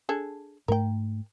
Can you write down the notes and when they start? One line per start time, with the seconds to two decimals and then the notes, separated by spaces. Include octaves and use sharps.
0.09 D4 G#4 A4
0.68 G#2 A3 A#4 G5